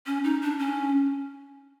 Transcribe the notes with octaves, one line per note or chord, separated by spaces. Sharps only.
C#4
D#4
D4
C#4